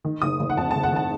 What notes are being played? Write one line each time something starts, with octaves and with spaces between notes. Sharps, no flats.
D#3
F#1 D#6
F#1
F#5
F2 A5
A5
F#1
F#5
D#3 A5